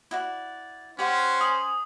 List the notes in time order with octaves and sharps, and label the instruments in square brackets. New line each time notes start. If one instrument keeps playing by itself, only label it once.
[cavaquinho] E4 F#4 D5
[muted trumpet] C#4 [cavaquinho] G4 F5 F#5 [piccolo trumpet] C5
[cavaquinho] G#5 [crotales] D#6 F#7